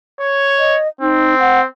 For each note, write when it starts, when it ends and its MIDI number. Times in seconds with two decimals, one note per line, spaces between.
0.20 0.76 73
0.59 0.88 75
1.01 1.66 60
1.01 1.35 63
1.39 1.60 78